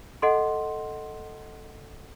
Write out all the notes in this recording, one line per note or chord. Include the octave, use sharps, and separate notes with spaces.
A4 D#5 F#5 C6